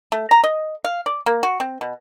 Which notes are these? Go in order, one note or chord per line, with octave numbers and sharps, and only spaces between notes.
A3
A#5
D#5
F5
D5
A#3
F#4
C4
B2